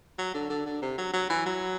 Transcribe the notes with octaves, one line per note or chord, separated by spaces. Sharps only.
F#3
D3
D3
D3
C3
F#3
F#3
E3
F#3